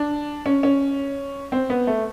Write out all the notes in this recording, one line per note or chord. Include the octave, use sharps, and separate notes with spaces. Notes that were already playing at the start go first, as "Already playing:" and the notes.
Already playing: D4
C#4
C#4
C4
B3
A3